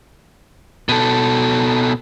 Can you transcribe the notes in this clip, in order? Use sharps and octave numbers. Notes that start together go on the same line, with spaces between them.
B2 A4